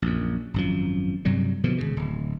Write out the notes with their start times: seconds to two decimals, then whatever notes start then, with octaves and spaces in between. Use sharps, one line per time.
0.02 A#1 F#2
0.54 G#1 F#2 F3
1.25 G2 C3 F#3 G3
1.64 B2 D3 E3 F3
1.78 G#1 C#2 C#3
1.96 D1